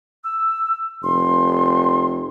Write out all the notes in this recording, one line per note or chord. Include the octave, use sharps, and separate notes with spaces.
E6
F1 C6